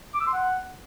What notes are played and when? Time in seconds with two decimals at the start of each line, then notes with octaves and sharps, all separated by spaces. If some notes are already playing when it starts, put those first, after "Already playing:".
0.14 D6
0.20 E6
0.27 C6
0.33 F#5